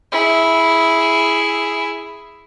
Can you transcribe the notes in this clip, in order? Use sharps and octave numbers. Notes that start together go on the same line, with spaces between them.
E4 G#4